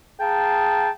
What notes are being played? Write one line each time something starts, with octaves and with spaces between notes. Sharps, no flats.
G#4 F5 G5 A5 A#5